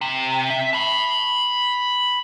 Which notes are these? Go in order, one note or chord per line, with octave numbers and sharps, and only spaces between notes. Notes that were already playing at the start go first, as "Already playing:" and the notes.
C3
E5
A5 B5